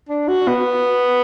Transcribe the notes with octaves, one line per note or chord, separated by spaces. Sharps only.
D4
F#4
B3